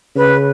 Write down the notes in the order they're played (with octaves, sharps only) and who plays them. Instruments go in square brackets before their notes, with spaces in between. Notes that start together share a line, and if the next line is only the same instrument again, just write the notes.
[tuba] C#3 [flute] B4